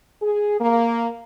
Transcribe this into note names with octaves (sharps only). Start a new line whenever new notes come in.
G#4
A#3